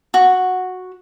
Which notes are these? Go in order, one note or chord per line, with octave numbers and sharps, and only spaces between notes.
F#4